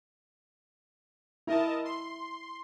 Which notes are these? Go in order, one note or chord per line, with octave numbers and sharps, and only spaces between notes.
E4 A#4 D#5 A5
C6